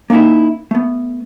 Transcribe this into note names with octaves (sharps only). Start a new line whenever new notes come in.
A#3 C#4 D#4 E4 E5
A3 B3